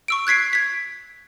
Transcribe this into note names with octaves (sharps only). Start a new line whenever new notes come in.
C#6 E6 D7
F#6 G#6 B6 C7 D7
G#6 B6